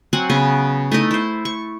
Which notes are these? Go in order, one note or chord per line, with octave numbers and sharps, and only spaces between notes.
F#3 C4 F#5 G#5
C#3 B3 G#5
A3 D#4 E4 D#5
E4 C5
C#6